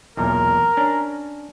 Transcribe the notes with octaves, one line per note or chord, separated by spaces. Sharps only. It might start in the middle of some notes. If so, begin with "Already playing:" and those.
B1 E2 A#2 A#4
C#4 D4